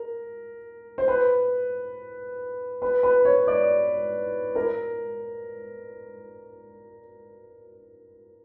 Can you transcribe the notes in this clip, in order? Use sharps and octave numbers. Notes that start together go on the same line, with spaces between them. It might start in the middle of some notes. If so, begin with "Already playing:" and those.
Already playing: A#4
C5
B4
B4
B4
C#5
D5
A#4